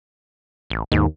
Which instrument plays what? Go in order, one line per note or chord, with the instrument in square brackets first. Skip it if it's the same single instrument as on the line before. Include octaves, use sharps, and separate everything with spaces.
[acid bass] A1
[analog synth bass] D#2 [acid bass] G#2